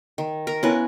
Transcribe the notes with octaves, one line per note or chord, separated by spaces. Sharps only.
D#3
A#4
B3 C#4 E4 B4 G#5